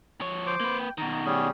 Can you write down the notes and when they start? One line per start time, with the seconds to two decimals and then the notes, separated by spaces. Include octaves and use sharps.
0.21 F3 C#5
0.46 C5 D6
0.60 A#3 B4
0.79 G5
0.98 B2 D#3 A#5
1.25 G3 C#4 G#4